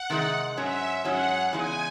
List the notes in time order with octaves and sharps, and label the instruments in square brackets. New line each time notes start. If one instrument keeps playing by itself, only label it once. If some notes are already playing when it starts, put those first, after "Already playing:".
Already playing: [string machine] F#5
[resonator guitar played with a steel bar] C3 D#3 G#3 D#4
[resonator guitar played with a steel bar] G#2 F#3 C#4 [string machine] E5
[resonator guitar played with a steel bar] G#2 F#3 C#4 [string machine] F#5
[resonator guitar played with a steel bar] E2 C#3 G#3 D#4 G#4 [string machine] G#5